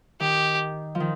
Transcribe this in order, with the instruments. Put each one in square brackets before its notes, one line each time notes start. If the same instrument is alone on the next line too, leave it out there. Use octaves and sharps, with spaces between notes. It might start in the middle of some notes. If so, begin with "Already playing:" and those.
[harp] D#3 [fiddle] G4
[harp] F3
D#3